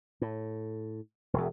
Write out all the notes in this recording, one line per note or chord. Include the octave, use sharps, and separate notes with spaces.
A2
E1 E2